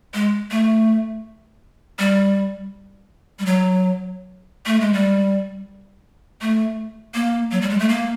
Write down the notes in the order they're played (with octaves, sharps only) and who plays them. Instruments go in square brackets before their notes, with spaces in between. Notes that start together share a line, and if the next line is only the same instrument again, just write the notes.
[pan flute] G#3
A3
G3
G3
F#3
A3
G#3
G3
A3
A#3
F#3
G3
G#3
A3
A#3